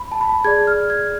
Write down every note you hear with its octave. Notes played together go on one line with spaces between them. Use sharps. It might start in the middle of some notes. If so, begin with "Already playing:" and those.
Already playing: B5
A5
B5
A5
G#4 D5 G#6
F6
G#6